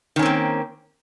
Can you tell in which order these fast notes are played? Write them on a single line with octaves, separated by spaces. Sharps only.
D#3 C#4 C4 A#3